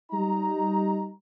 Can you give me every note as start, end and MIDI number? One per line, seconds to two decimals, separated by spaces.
0.12 1.12 55
0.12 1.12 63
0.12 1.12 82